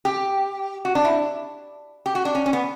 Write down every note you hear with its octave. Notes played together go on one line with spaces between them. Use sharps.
G4
F#4
D4
E4
G4
F#4
D4
C#4
C#4
B3